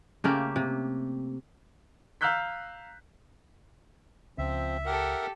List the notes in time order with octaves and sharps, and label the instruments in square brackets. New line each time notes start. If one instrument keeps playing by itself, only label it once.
[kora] C#3 A3 A#3 G4
C3
[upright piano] F5 A#5 E6 F#6 G6 B6
[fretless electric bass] C#2 [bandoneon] F3 C4 [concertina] E5
[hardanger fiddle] G4 A4 [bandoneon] A#4 F#5